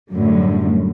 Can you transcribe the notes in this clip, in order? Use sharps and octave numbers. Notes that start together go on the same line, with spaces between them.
F#2 A2 D3 G3